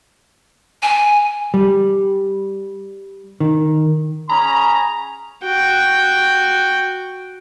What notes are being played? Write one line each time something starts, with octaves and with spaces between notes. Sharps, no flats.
G#5
G3
D#3
C#4 G#4 A#5 B5
F#4 G5